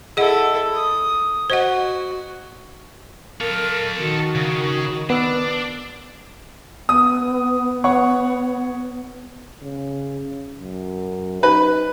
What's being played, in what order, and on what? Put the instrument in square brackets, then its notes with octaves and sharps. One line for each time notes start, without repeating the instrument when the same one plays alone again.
[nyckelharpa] E4 A4 [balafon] G#4 D#5 F#5
[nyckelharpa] D#6
[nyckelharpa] F#4 [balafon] C5 D#5 F#5
[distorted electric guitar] A4 F5 [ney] A#4
[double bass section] D#3 [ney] F#4
[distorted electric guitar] C#3
[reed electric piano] B3 E6 [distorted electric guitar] D4
[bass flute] B3 [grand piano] D#6
[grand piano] C#5 F#5 C#6
[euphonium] C#3
F#2
[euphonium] D#4 [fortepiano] B4